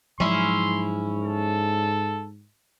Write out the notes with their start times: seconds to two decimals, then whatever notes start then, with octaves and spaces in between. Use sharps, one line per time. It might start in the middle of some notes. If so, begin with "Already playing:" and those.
0.20 G#2 F3 F#3 G#3 C#4 E4 C6
1.23 A4